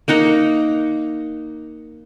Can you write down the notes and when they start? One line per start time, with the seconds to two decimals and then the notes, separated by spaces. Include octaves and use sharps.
0.08 A#3 D#4 F#5 A#5